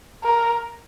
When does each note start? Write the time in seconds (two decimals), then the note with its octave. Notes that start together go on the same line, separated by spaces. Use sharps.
0.24 A#4